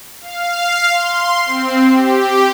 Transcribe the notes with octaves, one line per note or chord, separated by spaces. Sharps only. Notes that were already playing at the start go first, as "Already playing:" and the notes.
F5
C6
C4
G4